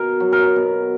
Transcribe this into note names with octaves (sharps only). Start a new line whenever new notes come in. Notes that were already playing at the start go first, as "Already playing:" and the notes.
Already playing: B2 A#4
F#3
A#4
B2